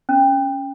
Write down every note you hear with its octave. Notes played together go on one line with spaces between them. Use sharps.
C#4